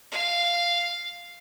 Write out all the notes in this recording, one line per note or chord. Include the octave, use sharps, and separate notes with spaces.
F5